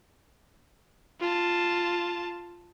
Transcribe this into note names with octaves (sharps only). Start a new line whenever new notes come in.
F4 A5